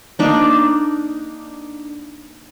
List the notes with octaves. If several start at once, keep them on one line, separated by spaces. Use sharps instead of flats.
A#3 D4 D#4